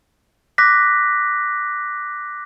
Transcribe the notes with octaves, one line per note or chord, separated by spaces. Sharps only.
D6 F#6 A#6 B6